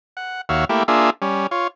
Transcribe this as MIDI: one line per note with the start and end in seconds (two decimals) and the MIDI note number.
0.17 0.41 78
0.49 0.65 39
0.49 0.65 66
0.49 0.65 73
0.49 0.65 76
0.49 0.65 77
0.69 0.83 57
0.69 0.83 58
0.69 0.83 64
0.69 0.83 67
0.88 1.10 58
0.88 1.10 62
0.88 1.10 65
0.88 1.10 68
0.88 1.10 76
1.22 1.47 55
1.22 1.47 61
1.51 1.68 65
1.51 1.68 73